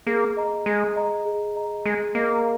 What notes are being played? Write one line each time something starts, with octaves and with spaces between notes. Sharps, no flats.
A#3 G#4
D#5 A#5
G#3 G#4
D#5 A#5
G#4
D#5 A#5
G#3 G#4
A#3 D#5 A#5